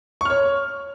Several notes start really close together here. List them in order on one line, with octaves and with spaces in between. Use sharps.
C#6 F6 C#5